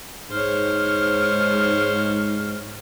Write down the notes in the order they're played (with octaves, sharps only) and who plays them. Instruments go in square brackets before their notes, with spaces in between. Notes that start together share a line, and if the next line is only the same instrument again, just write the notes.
[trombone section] G#2 [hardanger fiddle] C5 C#5 [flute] F6